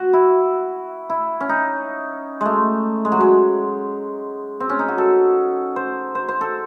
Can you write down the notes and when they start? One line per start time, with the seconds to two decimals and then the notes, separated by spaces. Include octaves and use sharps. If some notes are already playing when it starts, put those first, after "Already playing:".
Already playing: F#4
0.13 E4
1.10 E4
1.41 C#4
1.49 D#4
2.41 G#3 A3
3.05 G#3
3.12 F#3
3.20 G#3
4.60 C4
4.69 C#4
4.79 D#4
4.88 F#4
4.98 A4
5.76 C5
6.15 C5
6.29 C5
6.41 A4